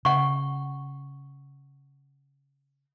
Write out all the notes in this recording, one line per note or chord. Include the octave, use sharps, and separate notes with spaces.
C#3 F#5 C#6